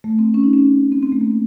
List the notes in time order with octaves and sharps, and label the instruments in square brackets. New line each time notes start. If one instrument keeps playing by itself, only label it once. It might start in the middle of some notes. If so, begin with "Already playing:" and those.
[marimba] A3
C4
C#4
D#4
C#4
C4
C4
A3
A#3
C4